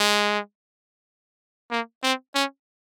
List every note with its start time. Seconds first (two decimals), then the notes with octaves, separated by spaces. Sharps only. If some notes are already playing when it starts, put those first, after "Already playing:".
Already playing: G#3
1.71 A#3
2.03 C4
2.35 C#4